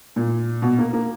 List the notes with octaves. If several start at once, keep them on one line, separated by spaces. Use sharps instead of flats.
A#2
B2
A#3
A#3